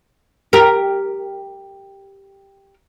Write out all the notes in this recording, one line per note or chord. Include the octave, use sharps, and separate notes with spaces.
G4 A#4